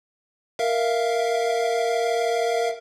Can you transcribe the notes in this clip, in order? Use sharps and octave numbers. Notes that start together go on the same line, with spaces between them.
A#4 E5 F5